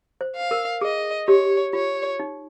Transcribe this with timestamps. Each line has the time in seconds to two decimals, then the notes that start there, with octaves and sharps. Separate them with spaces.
0.21 C5
0.36 F5
0.51 A#4
0.81 G#4 D#5
1.28 G4 C#5
1.73 F4 C#5
2.20 D#4